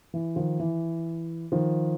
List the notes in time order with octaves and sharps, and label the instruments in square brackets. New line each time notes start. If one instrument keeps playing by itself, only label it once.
[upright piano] E3
D#3 F3
E3
D#3 F3